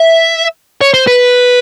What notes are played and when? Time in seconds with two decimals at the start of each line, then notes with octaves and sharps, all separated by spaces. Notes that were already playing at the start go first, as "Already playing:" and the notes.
Already playing: E5
0.81 C#5
0.94 C5
1.07 B4